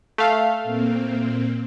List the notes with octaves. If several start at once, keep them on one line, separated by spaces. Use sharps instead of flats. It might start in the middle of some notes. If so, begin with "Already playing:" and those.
A3 F5
A#2 A#3 C4